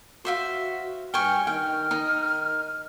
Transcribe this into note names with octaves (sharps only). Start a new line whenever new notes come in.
F#4 C5 E5 F5
G2 G5 G#5 C#6 F6
D#3 G5 F6
D#3 D#4